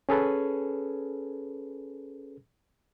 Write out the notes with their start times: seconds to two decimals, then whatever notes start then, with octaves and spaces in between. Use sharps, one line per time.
0.09 C#4 G#4 A4 B4